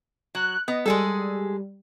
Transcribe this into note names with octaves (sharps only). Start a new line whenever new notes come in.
F#3 F#6
B3 D#5
G3 G#3 G#4 A4